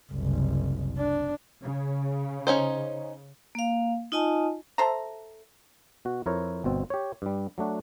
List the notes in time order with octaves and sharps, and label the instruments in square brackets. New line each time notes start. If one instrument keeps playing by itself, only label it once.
[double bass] F#1 C2
D4
[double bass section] C#3
[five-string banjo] C#4 D#4 C5
[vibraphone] A#3 F5
D#4 F4 D#5 G#5 A5
[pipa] A4 C5 E5 A#5
[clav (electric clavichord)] B2 F#4
F2 E4 A#4 C5 C#5
G1 B2 C4
G4 C#5
G2 G3
F#3 A3 D4 F#4